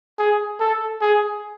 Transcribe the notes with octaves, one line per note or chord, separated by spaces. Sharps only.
G#4
A4
G#4